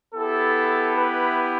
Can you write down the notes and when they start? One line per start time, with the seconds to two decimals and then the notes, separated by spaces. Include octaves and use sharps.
0.14 B3 E4 G4 A4
0.96 B4